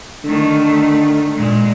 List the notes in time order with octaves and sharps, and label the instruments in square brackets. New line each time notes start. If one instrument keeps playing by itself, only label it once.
[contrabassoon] D3 [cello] D#3 A3
[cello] A#2 G#3